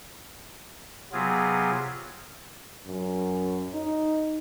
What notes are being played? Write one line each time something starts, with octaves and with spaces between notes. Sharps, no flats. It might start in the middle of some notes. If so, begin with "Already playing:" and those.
C3 F#3 B3 F4 G#4
F#2
D#4